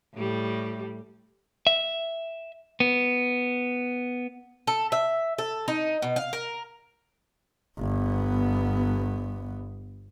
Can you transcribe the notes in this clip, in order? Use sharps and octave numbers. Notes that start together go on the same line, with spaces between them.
A2 G3
E5
B3
A4
E5
A4
D#4
B2
F5
A#4
G1 B3